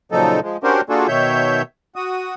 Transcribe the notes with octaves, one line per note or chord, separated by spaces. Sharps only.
A#2 C#3 F3 F#3 D#4 A4
F3 G#3
C#4 D4 F#4 G4 A#4 C5
A#3 D4 F4 F#4 G#4 A4
B2 D#3 C#5 E5 G6
F#4 D#6